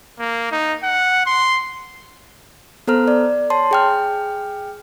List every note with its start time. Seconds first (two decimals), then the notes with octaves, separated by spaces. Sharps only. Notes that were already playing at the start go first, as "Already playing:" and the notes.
0.19 A#3
0.52 D#4
0.83 F#5
1.26 C6
2.87 B3 A4 C5 A#5 F6
3.08 D5
3.50 C#5 A5 C6
3.71 G#4 G5 F6